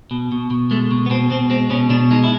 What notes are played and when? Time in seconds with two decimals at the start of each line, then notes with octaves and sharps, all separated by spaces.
0.11 B2
0.32 B2
0.50 B2
0.71 G#3 A3
0.91 B2
1.06 B3
1.10 B2 C4
1.30 B2 C4
1.50 G#3 C4
1.70 B2 C#4
1.90 B2 D4
2.11 G#3 D#4
2.24 E4